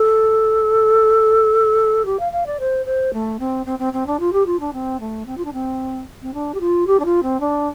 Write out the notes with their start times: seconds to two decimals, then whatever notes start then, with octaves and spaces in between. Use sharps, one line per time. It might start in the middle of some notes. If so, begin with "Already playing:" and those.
Already playing: A4
2.05 G4
2.19 F5
2.32 F5
2.46 D5
2.59 C5
2.85 C5
3.13 A3
3.39 C4
3.66 C4
3.79 C4
3.93 C4
4.06 D4
4.19 F4
4.32 G4
4.46 F4
4.59 D4
4.73 C4
5.00 A3
5.26 C4
5.37 F4
5.45 D4
5.53 C4
6.22 C4
6.33 D4
6.54 G4
6.60 F4
6.86 G4
6.99 D4
7.05 F4
7.22 C4
7.40 D4